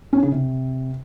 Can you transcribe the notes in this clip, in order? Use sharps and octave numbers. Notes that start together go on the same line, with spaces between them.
C#4
C#3
C3